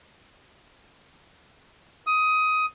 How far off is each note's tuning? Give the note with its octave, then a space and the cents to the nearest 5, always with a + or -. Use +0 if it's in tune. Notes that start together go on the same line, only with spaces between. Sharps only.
D#6 +15